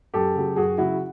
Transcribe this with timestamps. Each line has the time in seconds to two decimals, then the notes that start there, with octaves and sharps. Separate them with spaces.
0.14 F#2 G4 A4
0.35 C#3 F#3
0.56 F#2 F#4 G#4
0.78 C#3 F#3 E4 F#4